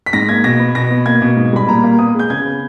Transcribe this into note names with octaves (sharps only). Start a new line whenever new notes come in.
B6
G#2 A#6
A#3 G#6
B2 A#6
B3
B2 A#6
B3
A#3 G#6
B2
G#2
G3 B5
A#2 A#5
A#3
B3 D#6
G#3 G6
C#3 G#6
B3